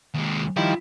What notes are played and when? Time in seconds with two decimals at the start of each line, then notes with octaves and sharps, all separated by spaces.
0.14 D#2 G#3
0.57 D#3 F3 G3 E4